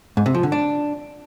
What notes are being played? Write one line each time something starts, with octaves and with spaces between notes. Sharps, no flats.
G#2
C3
F3
D3
D4